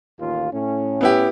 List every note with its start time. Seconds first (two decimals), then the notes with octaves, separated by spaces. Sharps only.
0.20 A1 D#2 F4
0.52 A2 C#4
1.01 B3 E4 G4